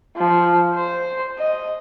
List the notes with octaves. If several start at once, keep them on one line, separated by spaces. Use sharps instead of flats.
F3
C5
D#5